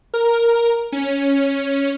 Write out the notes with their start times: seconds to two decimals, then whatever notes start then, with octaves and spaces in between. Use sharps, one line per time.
0.14 A#4
0.92 C#4